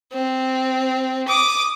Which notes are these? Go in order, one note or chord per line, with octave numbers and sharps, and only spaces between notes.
C4
D6 D#6